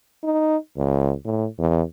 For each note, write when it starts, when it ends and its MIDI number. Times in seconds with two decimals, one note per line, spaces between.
0.23 0.56 63
0.77 1.13 37
1.25 1.46 45
1.58 1.82 40